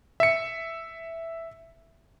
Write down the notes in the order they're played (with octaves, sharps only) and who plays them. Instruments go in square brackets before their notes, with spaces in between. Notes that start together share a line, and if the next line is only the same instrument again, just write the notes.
[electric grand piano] E5 C#7